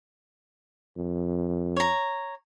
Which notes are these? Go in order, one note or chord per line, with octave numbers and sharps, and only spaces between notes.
F2
C#5 A#5